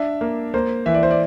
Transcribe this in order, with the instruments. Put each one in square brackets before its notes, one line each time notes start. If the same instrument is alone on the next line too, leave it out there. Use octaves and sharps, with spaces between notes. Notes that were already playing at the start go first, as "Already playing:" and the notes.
Already playing: [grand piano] D4 E5
A#3
A#3 C5
E3 E5
D5
C5
D5